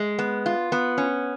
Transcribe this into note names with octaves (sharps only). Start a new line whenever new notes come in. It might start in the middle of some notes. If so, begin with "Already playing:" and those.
Already playing: G#3
B3
F4
B3
C#4